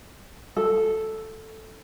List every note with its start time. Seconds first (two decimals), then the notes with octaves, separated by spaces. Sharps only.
0.57 A4